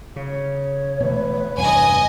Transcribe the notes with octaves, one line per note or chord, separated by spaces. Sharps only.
C#3 C#5
B2 E3 A3 B4
E2 G2 C3 D#5 G#5